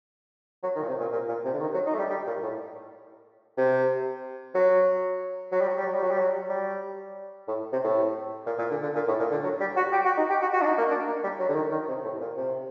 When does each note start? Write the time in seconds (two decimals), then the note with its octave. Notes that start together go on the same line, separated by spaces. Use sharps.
0.63 F#3
0.76 D#3
0.83 A#2
0.88 C3
1.00 A#2
1.12 A#2
1.29 A#2
1.45 C3
1.53 D3
1.61 D#3
1.74 F#3
1.86 D#4
1.94 A3
1.99 G3
2.10 G3
2.27 A#2
2.43 A2
3.58 C3
4.55 F#3
5.52 F#3
5.61 G3
5.69 F#3
5.77 G3
5.86 F#3
5.94 G3
6.02 F#3
6.11 G3
6.19 F#3
6.50 G3
7.48 A2
7.73 C3
7.84 A2
8.46 A#2
8.58 A#2
8.71 D3
8.83 D3
8.95 A#2
9.08 A2
9.20 A#2
9.31 D3
9.44 F#3
9.60 G3
9.77 F#4
9.92 G4
10.05 F#4
10.17 D#4
10.30 G4
10.42 F#4
10.53 F#4
10.61 D4
10.65 D#4
10.78 A#3
10.91 D4
11.07 A#3
11.23 G3
11.39 F#3
11.49 D3
11.55 D#3
11.71 D#3
11.89 C3
12.04 A2
12.21 A#2
12.36 C3